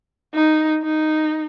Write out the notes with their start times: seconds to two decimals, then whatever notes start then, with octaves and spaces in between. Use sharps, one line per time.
0.34 D#4
0.83 D#4